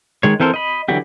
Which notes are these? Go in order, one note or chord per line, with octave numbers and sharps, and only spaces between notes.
D#3 G#3 C#5
E3 C4 A4 A#4 C5
D#5 B5
D3 E3 F#3 F#4 G4